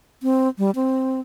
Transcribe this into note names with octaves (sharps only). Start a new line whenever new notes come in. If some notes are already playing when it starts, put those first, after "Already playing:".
C4
G3
C4